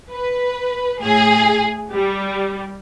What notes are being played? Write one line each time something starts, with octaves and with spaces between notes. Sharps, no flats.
B4
A2 G#4
G3